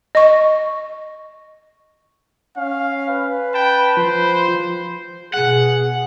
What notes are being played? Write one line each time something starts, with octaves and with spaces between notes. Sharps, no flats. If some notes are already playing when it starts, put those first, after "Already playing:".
D#5 C#6
C#4 F5
B4
G5 A5 B5
F3 C5
B2 G#4 F#5